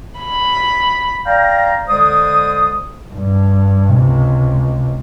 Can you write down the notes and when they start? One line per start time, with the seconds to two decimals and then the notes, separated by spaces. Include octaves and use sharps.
0.20 B5
1.25 D5 F5 G5 A#5
1.89 D3 G#3 C5 D5 D#6
3.13 G2
3.91 C#2 C3